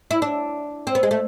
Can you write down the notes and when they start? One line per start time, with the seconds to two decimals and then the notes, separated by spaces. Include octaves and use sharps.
0.11 E4
0.22 D4
0.87 C4
0.95 B3
1.03 G#3
1.11 A3